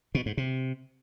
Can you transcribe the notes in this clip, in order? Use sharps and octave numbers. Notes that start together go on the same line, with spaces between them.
B2
G#2
C3